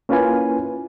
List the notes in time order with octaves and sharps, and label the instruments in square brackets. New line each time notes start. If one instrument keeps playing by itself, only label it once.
[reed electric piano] A#3 C#4 E4 F4 B4 G#5